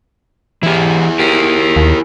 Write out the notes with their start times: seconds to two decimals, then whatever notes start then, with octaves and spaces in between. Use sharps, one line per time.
0.63 E3 E4 G4 G#4
1.20 G4 A#4
1.76 D#2